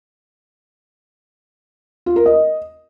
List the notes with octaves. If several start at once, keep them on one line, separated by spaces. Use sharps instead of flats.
F4
A#4
D#5